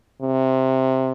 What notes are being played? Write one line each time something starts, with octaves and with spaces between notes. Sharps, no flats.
C3